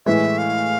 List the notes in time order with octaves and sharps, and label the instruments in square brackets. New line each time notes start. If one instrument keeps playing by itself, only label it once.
[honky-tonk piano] A2 E3 G#3 [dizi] E5
[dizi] F5